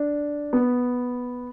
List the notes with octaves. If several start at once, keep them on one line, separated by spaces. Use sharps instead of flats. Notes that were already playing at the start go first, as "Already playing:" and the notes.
Already playing: D4
B3